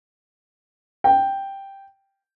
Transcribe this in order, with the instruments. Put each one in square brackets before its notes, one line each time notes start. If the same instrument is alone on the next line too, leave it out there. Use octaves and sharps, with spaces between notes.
[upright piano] G5